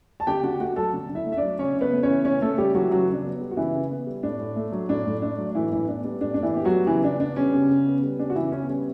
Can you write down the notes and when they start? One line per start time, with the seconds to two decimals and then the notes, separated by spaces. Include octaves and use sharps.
0.20 A5
0.27 D3 G4 G5
0.43 D3 F#4 F#5
0.60 A3 F#4 F#5
0.76 F#3 A4 A5
0.93 D3
1.09 D3
1.15 E4 E5
1.26 A3
1.32 E5
1.37 D4 D5
1.42 F#3
1.59 C#3 C#4 C#5
1.76 C#3
1.81 B3 B4
1.92 A3
2.03 C#4 C#5
2.09 E3
2.25 C#3 C#4 C#5
2.41 C#3 A3 A4
2.57 G3 A3 G4
2.74 E3 F#3 F#4
2.91 C#3 F#3 F#4
3.07 C#3
3.13 D4
3.24 B3
3.41 G3
3.51 F#4
3.57 C#3 E3 E4
3.74 C#3
3.90 B3
4.07 G3
4.23 A2 D4
4.40 A2
4.56 A3
4.72 F#3
4.89 A2 D4
5.06 A2
5.22 A3 D4
5.38 F#3
5.55 A2 E3 E4
5.71 A2 E3 E4
5.88 B3 D4
6.04 G3 D4
6.21 A2 D4
6.34 A2 D4
6.43 E3 E4
6.54 B3 G4
6.65 F#3 F#4
6.71 G3
6.87 C#3 E3 E4
7.04 C#3 D4
7.20 B3 D4
7.36 G3 C#4
7.53 C#3
7.69 C#3
7.86 B3
8.03 G3
8.19 C#3 D4
8.30 F#4
8.35 C#3 E3 E4
8.52 B3 C#4
8.68 G3 C#4